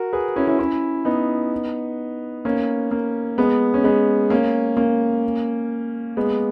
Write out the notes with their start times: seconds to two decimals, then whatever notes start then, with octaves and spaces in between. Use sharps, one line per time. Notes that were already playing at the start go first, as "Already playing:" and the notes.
Already playing: F#4 A#4
0.13 G#4 B4
0.36 C#4 E4
0.47 C#4 E4
0.59 C#4 E4
1.05 B3 D#4
2.45 A#3 C#4
2.91 A#3
3.38 G#3 B3
3.74 C#4
3.84 G#3 B3
4.30 A#3 C#4
4.77 A#3 C#4
6.17 G#3 B3